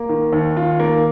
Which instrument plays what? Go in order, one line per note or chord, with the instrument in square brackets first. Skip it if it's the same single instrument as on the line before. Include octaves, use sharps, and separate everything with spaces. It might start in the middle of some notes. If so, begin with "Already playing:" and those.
Already playing: [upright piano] A#3
D#3
D#2
F4
A#3